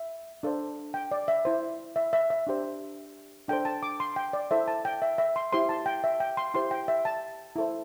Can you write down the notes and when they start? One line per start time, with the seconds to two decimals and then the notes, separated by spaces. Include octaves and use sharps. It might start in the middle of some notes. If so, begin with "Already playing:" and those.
Already playing: E5
0.43 D4 A4 C5
0.94 G5
1.11 D5
1.28 E5
1.45 E4 C5
1.96 E5
2.13 E5
2.30 E5
2.47 D4 G4 C5
3.48 D4 A4 C5 G5
3.65 A5
3.83 D6
4.00 C6
4.16 G5
4.33 D5
4.51 E4 A4 C5 E5
4.68 A5
4.85 G5
5.02 E5
5.18 E5
5.36 C6
5.52 E4 G4 C5 C6
5.69 A5
5.86 G5
6.04 E5
6.20 G5
6.37 C6
6.54 E4 G4 C5 C6
6.71 G5
6.88 E5
7.05 A5
7.56 E4 A4 C5